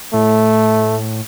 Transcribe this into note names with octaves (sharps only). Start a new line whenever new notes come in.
A2 A3